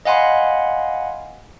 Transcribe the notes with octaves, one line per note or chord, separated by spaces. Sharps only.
D#5 F5 F#5 G#5 B5 C6